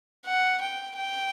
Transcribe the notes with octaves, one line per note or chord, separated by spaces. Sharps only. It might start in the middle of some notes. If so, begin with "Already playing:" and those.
F#5
G5
G5